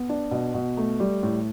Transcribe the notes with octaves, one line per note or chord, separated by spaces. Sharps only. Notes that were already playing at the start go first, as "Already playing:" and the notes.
Already playing: B3
D4
B2
B2
A3
G3
A2